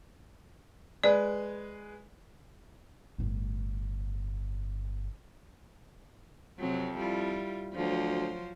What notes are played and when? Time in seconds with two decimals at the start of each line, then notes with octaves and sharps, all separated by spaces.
1.04 G#3 G#4 B4 D5
3.18 G1 A2
6.58 F2 C3 F#3 C4
6.97 G3 E4 F4
7.74 D2 F3 F#3 C5